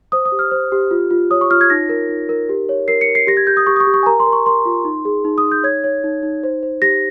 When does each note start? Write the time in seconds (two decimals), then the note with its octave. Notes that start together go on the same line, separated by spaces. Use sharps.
0.12 C5 D#6
0.25 D#6
0.32 G4
0.39 F6
0.51 C5
0.72 G4
0.91 F4
1.11 F4
1.31 C#5 D#6
1.41 C#6
1.51 F4 F6
1.61 G#6
1.70 D#4 A#6
1.89 A#4
2.09 D#4
2.29 A#4
2.49 G4
2.69 C#5
2.88 A#4 C7
3.01 C#7
3.08 A#4
3.15 C7
3.27 G4 A#6
3.37 G#6
3.47 G4 G6
3.57 D#6
3.67 G4 C#6
3.76 D#6
3.80 C#6
3.87 G4
3.94 C#6
4.03 G#5
4.06 A#4 A#5
4.20 C6
4.26 A#4
4.33 C#6
4.46 A#4 C6
4.65 F4
4.85 D#4
5.05 G#4
5.25 D#4
5.38 D#6
5.44 D#4
5.52 G6
5.64 C#5 G#6
5.84 C#5
6.04 D#4
6.23 D#4
6.43 C5
6.63 C5
6.82 G4 A#6